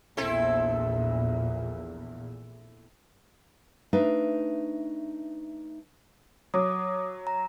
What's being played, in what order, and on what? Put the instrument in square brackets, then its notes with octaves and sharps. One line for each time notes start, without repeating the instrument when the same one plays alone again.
[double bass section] A#1 E2 A#2 [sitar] C4 E4 A4
[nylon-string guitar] A3 D4 D#4 B4 E5 F5
[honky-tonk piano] F#3 [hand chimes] D6 D#6
[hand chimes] A#5